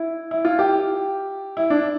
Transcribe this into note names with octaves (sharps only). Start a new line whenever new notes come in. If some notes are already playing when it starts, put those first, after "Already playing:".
Already playing: E4
E4
F4
G4
E4
D4